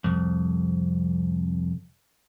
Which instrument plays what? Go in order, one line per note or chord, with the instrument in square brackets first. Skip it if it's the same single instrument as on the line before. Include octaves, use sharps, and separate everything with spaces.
[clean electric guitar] C2 F2